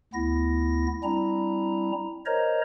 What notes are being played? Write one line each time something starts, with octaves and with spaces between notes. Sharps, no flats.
D2 B3 E4 A#6
G3 C4 D4 E4 A#5
A#4 C5 C#5 D#5 A#5